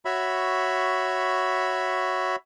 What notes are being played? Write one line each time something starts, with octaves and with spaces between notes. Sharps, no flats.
F#4 C#5 E5 B5